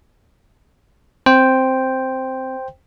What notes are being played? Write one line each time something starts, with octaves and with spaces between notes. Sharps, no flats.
C4 C5 G5